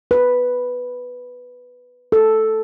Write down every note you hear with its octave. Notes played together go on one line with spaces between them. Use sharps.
B4
A4